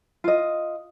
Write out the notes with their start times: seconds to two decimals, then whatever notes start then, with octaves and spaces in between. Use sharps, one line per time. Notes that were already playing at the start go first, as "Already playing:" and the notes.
0.24 F4 D#5